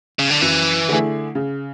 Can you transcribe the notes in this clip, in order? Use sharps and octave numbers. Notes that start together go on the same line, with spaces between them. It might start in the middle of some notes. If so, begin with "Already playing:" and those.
C#3
D3
F#2 E3
D3 A3 E4 G#4
C#3